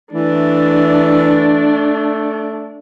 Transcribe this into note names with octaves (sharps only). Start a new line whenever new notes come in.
E3 A3 D4